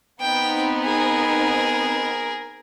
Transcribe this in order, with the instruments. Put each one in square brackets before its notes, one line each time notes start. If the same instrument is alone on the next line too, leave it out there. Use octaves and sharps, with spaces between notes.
[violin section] B3 C4 D#4 [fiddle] G5
[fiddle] G#4 A#4